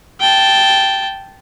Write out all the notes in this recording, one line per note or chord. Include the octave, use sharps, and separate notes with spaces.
G5 A5